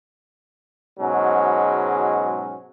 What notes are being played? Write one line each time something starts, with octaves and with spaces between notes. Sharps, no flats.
G#2 B2 F#3 G#3 C#4